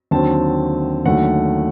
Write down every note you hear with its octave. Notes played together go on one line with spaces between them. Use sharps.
D#2 D3 F#3 C4 A5
D#2 D3 F#3 A3 F#5